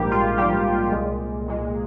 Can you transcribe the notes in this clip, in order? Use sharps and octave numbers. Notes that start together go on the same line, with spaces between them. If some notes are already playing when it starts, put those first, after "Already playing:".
Already playing: A#1 G#2 G3 A#3 G4
F4
A#1 G#2 G3 A#3 G4
C2 A#2 G#3
C2 A#2 G#3